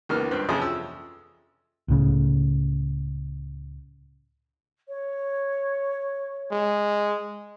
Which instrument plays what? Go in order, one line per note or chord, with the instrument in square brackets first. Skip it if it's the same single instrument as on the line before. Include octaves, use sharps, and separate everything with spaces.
[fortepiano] C#2 D#3 A#3 B3 F6
G2 C4 B4
F2 C3 F3 C#4 G#4 D#6
E6
[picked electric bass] C#2 A2 C#3
[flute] C#5
[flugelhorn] G#3